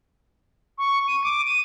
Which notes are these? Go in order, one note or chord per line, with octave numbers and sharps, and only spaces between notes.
C#6
D#7
D6
D#7